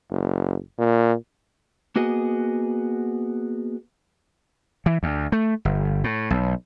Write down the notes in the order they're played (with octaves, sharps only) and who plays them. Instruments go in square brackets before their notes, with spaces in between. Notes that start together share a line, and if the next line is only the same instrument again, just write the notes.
[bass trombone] F#1
A#2
[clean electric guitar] A#3 B3 F#4 G#4 D#5
[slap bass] E3
D2
A3
G1
A2
B1